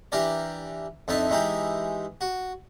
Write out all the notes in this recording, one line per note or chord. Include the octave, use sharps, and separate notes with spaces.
E3 D4 G4 A#4 D5
F2 D4 D#4 E5 A5
E3 G#3 D#4 E4 G4
F#4